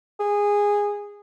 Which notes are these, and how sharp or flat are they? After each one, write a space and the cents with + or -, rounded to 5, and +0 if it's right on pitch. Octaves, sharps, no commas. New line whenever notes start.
G#4 -15